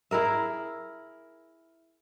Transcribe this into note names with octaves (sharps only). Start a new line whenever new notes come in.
E4 G#4 A#4 E5